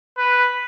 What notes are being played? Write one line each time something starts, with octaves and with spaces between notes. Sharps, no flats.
B4